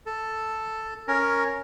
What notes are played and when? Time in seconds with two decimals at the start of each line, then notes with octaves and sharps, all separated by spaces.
0.06 A4
1.08 C#4 A#4